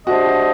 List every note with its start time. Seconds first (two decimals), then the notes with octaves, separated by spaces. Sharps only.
0.06 A3 D4 F#4 G4 C5 D#5
0.26 F#4